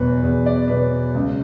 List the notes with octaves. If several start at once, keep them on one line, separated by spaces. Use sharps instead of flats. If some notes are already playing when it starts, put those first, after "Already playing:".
Already playing: E2 B2 F#3 B4
E2
D5
B2 F#3 B4
C#2